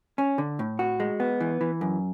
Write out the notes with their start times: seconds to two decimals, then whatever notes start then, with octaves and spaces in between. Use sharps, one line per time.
0.18 C#4
0.38 D3
0.59 A2
0.79 F#4
1.00 G#3
1.20 B3
1.41 E3
1.61 E3
1.81 F#2